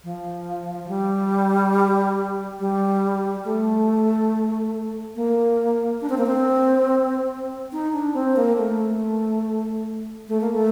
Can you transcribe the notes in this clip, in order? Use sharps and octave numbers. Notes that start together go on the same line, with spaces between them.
F3
F3
G3
G3
A3
A#3
D4
C4
A#3
C4
D#4
D4
C4
A#3
A3
A3
A#3
A3